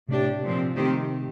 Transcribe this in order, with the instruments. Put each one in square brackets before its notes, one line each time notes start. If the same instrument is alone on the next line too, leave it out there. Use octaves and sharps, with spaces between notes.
[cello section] A2 A3 D4 G4 [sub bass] C3
[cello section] A#2 F3 C4
D#3 A3 C4 G4